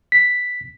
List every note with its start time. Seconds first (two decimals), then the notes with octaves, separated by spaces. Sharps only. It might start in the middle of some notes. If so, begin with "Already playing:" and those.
0.12 B6